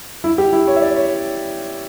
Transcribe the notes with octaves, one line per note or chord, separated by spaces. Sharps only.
E4
G4
E4
C#5
E5
D5
C#5